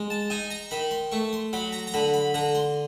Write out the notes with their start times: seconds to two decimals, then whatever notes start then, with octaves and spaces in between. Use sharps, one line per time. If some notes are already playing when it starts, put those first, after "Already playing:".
Already playing: G#3
0.10 A5
0.30 D#4 G#5
0.50 A#5
0.71 D#3 B5
0.91 C6
1.12 A3 C#6
1.33 C6
1.53 F#3 B5
1.72 A#5
1.87 A#5
1.94 D3 B5
2.14 B5
2.34 D3 A#5
2.55 C6